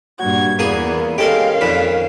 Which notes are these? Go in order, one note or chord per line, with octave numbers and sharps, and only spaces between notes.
G2 A#2 F#4 G#6
E2 A#2 E3 A#3 B3 G#4 D#6
G#3 C#4 G4 A4 A#4 F5
F2 A#2 D#3 B5